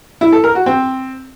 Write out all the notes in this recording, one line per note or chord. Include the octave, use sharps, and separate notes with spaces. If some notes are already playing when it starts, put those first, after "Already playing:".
E4
A4
A#4
F#4
C4